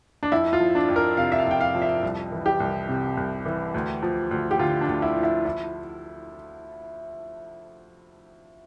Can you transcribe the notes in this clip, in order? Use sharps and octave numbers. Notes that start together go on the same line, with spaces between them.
D4
F2 E4
F4
F3
D4
F2
A#4
C3 F5
E5
F5
F2 G5
F5
F3
E5
C2
E3
G4
C2
C3
C2
E3
D2
F3
D2
G4
D3 F4
D4
D2
E4
F3
E4
E4